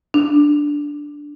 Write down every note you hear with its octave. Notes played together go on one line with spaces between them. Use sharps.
D4